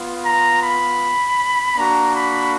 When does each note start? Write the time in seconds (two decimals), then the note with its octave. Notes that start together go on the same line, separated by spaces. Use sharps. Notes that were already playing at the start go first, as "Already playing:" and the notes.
Already playing: B3 F4
0.26 A#5
0.63 B5
1.76 A#3 D4 F#4 A#5
2.15 B5